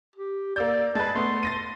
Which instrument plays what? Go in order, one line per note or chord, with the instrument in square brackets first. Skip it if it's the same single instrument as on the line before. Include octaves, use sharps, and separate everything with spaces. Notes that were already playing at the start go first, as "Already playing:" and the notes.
[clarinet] G4
[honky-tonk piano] A#3 E6 G6 [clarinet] D5
[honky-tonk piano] G#3 B4 [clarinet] A5
[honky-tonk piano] A3 B3 [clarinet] C6
[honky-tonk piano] A6 A#6 D#7